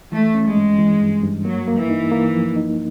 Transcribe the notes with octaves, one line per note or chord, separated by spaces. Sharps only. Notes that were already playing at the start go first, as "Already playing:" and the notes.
E3 A3
C#4
G#3
G2
E3
G2
G2
F#3 A#3
A#3
E3
D#4
A#3
F3
D#4